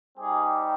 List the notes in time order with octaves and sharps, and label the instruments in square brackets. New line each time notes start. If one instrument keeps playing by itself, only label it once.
[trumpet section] G3 C4 D#4 G4 G#4